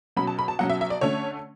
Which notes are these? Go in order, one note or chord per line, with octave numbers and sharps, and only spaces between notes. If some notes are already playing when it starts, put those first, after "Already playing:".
B2 F#3 C#4 B5
A5
B5
A5
B2 F#3 C#4 F#5
E5
E5
D5
D3 A3 C#4 C#5